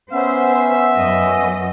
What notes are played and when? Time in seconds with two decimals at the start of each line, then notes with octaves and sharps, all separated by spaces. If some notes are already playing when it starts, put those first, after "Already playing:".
0.12 B3 C#4 C5 E5
0.96 F#2 D#5